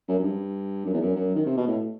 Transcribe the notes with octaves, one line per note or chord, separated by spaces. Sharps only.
F#2
F#2
G2
F#2
E2
F#2
F#2
D#3
C3
B2
A2